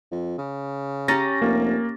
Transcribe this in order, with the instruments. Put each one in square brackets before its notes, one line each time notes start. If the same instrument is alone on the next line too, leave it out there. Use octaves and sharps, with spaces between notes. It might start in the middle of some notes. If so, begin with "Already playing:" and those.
[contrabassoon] F2
C#3
[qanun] C#4 G4 [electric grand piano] A#5 A6 A#6
[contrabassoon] F1 [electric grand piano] A#3